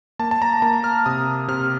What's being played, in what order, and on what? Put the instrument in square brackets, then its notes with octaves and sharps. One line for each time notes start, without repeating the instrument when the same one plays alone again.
[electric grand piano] A#3 A5
A5
A#5
A#3 A#5
F6
C3 D#6
C3 F6